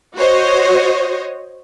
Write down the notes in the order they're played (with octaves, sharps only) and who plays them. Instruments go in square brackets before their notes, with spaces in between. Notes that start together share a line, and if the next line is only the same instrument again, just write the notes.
[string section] F#4 C5 C#5 D#5